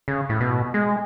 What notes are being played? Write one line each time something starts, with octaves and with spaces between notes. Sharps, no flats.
C#3
A2
B2
G#3